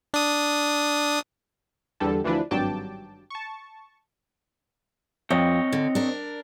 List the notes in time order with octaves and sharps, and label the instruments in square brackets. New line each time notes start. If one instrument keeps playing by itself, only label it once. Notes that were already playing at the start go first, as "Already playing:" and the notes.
[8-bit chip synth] D4 D#6
[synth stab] E2 D3 G3 A4
D2 E3 F3 D4 B4
G#1 G2 F#3 G5 A5 D6
A5 C#6
[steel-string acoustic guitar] F2 [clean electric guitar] C4 C#5 D#5
[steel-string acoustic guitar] D3
D4 A#4